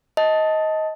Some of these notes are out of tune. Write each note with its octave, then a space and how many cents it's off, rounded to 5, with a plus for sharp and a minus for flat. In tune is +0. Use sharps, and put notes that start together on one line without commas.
D#5 +15 A5 +0